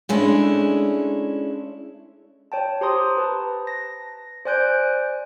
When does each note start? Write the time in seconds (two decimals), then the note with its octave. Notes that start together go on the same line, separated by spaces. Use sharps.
0.09 G#3 A3 C#4 D4 E4
2.52 C#5 G5 A5
2.81 G4 C5 A#5 C6 D#6
3.18 B4 A5
3.67 A#6
4.45 C5 D5 G#5 F#6 G6 D7